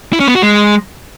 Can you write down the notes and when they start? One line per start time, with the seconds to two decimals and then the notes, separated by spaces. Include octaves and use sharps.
0.13 E4
0.20 C#4
0.28 B3
0.35 F#4
0.42 G#3